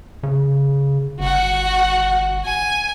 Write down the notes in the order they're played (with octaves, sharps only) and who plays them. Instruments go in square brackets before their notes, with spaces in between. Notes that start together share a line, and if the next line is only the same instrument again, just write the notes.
[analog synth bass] C#3
[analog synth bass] G1 [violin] F#4 F#5
[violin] G#5